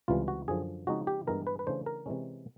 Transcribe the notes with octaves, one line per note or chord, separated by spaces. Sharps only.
C#2 C3 E3 G3 F4
F#4
F#2 D3 F3 G#4
C#3 F3 G#3 C4 D#4 F#4
G4
G2 E3 G#3 B3 A#4
B4
B4
C#3 E3 A3 D4 C5
A#4
C3 E3 G#3 C#4